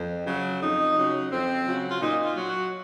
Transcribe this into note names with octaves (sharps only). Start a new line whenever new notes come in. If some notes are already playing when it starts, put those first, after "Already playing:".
Already playing: F2
C#3 F#3
F2 D#4
C#3 F#3
F2 C4
C#3 F#3
F4
A#2 D#4
F4
F#3
F#4